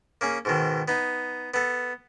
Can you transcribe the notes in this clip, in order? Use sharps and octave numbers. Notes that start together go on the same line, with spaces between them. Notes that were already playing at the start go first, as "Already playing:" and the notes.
A#3 C#4 G#4
G#2 B2 D#3
B3 D#4
B3 A4